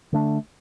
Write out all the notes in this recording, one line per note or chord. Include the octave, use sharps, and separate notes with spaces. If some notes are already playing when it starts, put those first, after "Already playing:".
D3 A3 D4